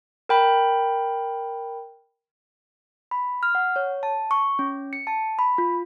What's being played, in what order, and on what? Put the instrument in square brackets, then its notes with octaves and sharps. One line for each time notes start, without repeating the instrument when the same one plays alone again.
[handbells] A#4 G5 B5
[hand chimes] B5
F6
F#5
C#5
A5
C#6
C#4
C#7
A5
B5
F4